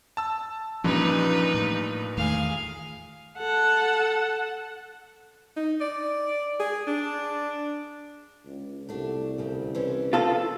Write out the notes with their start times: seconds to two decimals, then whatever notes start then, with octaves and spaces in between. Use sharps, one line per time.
0.17 A5 E6
0.84 G2 A#2 E3 F3 C#4 D#4 B4
1.54 A2
2.17 E2 D#3 A3 G#4 F5
3.38 A4 F#5
5.56 D#4
5.80 D5
6.60 G#4
6.87 D4
8.46 C#2
8.89 C2 A3 D4 F#4
9.38 D2 C#3 C4
9.75 E3 C4 C#4
10.13 F4 A4